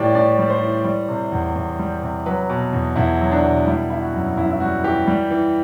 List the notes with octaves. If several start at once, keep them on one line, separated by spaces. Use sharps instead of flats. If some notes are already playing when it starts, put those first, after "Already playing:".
Already playing: A2 E3 G3 G4 D5
A2 D5
G3
C5
E3
G3
C3
E2
E2
G3
C3
F#3 B4
B2
E2
E2 E4
F#3
D4
B2
G3 E4
E3 E4
F#4
F#2
F#2 E4
E4
G3 F#4
E3 G4
G3
E3